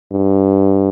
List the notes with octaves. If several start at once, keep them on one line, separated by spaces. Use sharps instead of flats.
G2